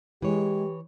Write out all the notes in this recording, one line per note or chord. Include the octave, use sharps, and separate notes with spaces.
E3 G#3 G4 C#5